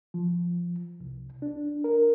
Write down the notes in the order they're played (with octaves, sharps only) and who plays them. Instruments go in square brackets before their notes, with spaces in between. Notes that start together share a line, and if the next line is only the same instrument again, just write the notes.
[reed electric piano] F3
C2
D4
A#4